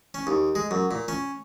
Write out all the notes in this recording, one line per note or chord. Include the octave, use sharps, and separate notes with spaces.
C#4
D#2
G#3
F#2
A#2
C#4